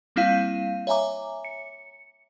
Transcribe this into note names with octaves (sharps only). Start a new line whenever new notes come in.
G3 A#3 C4 E4 F5 D#7
C#5 E5 G#5 A#5 D6
C#7